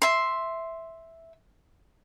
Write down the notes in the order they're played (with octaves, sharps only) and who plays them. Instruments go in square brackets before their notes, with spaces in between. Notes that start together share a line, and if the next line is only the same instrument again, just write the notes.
[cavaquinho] E5 C6